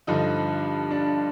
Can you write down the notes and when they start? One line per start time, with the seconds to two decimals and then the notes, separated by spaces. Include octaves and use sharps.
0.07 G2 D3 F3 D#4
0.91 D4